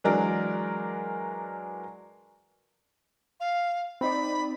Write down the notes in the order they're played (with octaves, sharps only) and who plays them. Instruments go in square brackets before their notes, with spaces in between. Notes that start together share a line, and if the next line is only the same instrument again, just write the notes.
[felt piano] E3 F#3 G#3 D4 A#4 D5
[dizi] F5
[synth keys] C4 D#4 D5 [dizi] B5